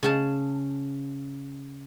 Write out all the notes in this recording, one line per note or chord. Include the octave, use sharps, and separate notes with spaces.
C#3 G#4 A5